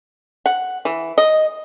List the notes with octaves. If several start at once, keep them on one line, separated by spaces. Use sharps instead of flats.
F#5
E3
D#5